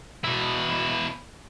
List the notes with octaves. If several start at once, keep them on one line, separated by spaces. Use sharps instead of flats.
B2 E4